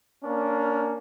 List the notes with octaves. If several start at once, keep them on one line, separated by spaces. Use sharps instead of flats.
A#3 C#4 D4